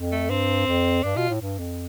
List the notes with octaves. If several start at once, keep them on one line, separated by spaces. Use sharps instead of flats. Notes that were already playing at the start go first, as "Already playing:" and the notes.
Already playing: F2
A3
G2 C4
F2
G2 D4
B2 F4
A2
G2
F2